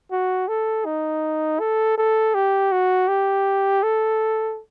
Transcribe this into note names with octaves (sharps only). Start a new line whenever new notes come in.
F#4
A4
D#4
A4
A4
G4
F#4
G4
A4